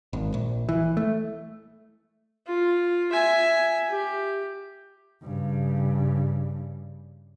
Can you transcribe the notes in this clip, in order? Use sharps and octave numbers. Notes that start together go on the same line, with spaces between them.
G#1
A#1
E3
A3
F4
E5 G#5
G4
G2 C#3